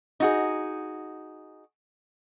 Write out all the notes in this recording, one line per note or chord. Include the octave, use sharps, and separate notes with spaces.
D#4 F#4 G#4